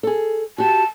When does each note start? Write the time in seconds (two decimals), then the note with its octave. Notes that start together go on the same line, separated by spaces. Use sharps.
0.03 G#4 A4
0.58 F#4 G4 A5